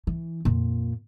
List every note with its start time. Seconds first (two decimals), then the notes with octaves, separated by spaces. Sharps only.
0.07 E3
0.45 F2 A#2